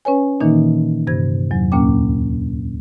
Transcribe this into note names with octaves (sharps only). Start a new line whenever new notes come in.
C#4 B4 C#5 G#5
A#2 D#3 E3 A#3 D#4
G2 C3 G#6
E2 F#3
D2 A#2 A#3 C#4 G5 D6